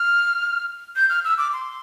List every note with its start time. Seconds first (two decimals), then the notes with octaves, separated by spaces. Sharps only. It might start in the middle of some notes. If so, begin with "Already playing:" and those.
Already playing: F6
0.96 G6
1.09 F6
1.25 E6
1.38 D6
1.53 C6